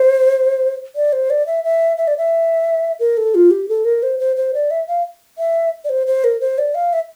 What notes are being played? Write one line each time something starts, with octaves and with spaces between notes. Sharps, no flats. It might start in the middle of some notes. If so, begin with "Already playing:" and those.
Already playing: C5
D5
C5
D5
E5
E5
E5
D5
E5
A#4
A4
F4
G4
A4
A#4
C5
C5
C5
D5
E5
F5
E5
D5
C5
C5
A#4
C5
D5
F5
E5